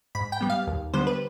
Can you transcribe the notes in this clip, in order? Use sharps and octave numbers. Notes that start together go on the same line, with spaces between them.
G#2 B5
G5
G3 B3
F5
D#2
D3 G3 B3 C5
B4